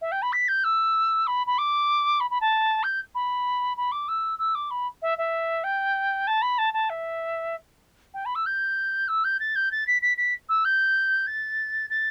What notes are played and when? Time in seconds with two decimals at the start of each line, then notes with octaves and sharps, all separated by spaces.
0.01 E5
0.12 G5
0.22 B5
0.33 B6
0.48 G6
0.64 E6
1.27 B5
1.47 B5
1.58 D6
2.20 B5
2.30 B5
2.41 A5
2.83 G6
3.15 B5
3.77 B5
3.92 D6
4.08 E6
4.39 E6
4.55 D6
4.71 B5
5.02 E5
5.18 E5
5.64 G5
6.27 A5
6.42 B5
6.58 A5
6.73 A5
6.90 E5
8.14 G5
8.25 B5
8.35 E6
8.46 G6
9.08 E6
9.24 G6
9.40 A6
9.56 G6
9.72 A6
9.87 B6
10.02 B6
10.17 B6
10.49 E6
10.65 G6
11.27 A6
11.90 A6